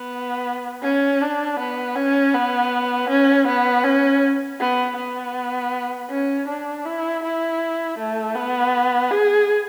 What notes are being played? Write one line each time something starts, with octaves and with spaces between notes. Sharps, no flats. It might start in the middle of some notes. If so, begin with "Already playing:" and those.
Already playing: B3
C#4
D4
B3
C#4
B3
C#4
B3
C#4
B3
B3
C#4
D4
E4
E4
A3
B3
G#4